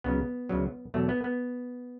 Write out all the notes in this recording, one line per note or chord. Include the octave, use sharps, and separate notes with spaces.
C#2 C#3 F#3 B3
D2 C#3 F#3
E2 B2 F#3 A3
B3
B3